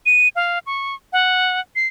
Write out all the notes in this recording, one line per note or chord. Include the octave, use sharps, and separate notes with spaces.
D#7
F5
C#6
F#5
C7